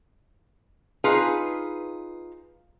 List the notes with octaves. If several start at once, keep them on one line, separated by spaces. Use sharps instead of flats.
D#4 F4 G#4 B4